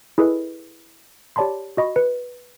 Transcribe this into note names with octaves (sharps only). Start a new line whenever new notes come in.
E4 G#4 A4 B4 D#5
G4 C#5 D5 A5 B5 C6
F#4 D#5 B5 C#6
B4 C#7